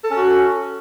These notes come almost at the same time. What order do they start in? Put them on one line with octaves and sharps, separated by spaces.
A4 C#4 F#4